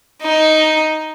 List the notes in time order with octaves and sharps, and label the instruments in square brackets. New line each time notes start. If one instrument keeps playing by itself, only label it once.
[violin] D#4